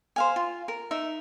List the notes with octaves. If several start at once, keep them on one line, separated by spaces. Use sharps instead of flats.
C5 F5 G#5
F4
A#4
D#4 E5